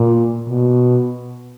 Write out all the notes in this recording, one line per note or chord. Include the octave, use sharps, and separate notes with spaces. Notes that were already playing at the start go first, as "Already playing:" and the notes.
Already playing: A#2
B2